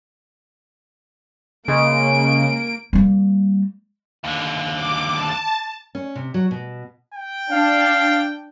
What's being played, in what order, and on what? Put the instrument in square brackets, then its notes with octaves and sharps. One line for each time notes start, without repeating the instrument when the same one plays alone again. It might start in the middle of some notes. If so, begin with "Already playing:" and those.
[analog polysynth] C#3 G#3 [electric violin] A#3 D7
[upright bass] G3 A#3
[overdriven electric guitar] D#2 D3
[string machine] D6
A5
[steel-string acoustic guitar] C#4
C3
F#3
B2
[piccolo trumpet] G5
[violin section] D4 [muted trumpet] F5